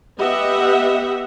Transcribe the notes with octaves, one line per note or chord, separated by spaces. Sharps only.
B3 G4 D#5 E5 F#5